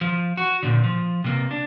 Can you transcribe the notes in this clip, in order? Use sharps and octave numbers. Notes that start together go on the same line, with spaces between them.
F3
F#4
A#2 D3
F3
C3 A#3
D4